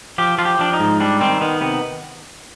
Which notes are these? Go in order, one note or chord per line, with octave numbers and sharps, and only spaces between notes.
F3 G4
F3 F4
G4
F3 D4
D#4
G#2
G3 D4
D#3 C4
D#3 B3
C3 B3